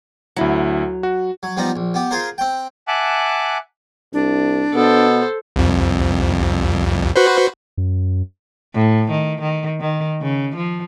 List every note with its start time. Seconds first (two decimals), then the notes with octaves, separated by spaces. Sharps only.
0.36 D2 F#3 E4 F#4
1.03 F#4
1.43 F#3
1.57 F3 G3 B3 D#4 A#5
1.76 A#1
1.94 B3 G4
2.11 F4 G#4 A#4 C5
2.38 C4 G5
2.88 E5 F#5 G#5 A5 D6 F#6
4.13 C2 D4
4.74 B2 B3 A4 C5
5.56 C2 F2
7.16 F#4 B4 C5
7.78 F#2
8.74 A2
9.11 D#3
9.41 D#3
9.80 D#3
10.22 C#3
10.56 F3